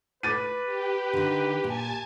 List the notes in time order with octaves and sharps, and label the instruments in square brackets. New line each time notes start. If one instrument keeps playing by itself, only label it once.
[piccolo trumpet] B4 [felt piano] D6 A6 D#7
[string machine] G4
[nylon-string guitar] D3 D#3
[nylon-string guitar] A#2 [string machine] G#5 A5 G#6